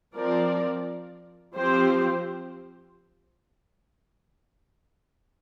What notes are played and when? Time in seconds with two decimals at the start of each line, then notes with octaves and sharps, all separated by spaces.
0.15 F3 C4 A#4 D5
1.55 F3 C4 G4 C5